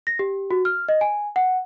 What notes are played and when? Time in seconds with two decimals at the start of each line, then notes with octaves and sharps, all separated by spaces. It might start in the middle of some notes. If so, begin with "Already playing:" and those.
0.07 A#6
0.19 G4
0.51 F#4
0.65 F6
0.89 D#5
1.01 G#5
1.36 F#5